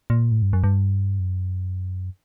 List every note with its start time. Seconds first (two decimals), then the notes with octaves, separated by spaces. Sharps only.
0.10 A#2
0.32 A2
0.42 G2
0.53 F#2
0.64 G2
1.19 F#2